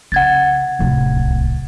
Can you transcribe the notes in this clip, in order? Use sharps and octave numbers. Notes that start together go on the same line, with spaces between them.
C#3 F#5 G#6 A6
D1 C2